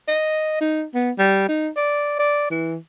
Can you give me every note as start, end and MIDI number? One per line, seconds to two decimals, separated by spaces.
0.08 0.58 75
0.61 0.84 63
0.94 1.11 59
1.18 1.45 55
1.48 1.69 63
1.76 2.15 74
2.19 2.49 74
2.50 2.76 52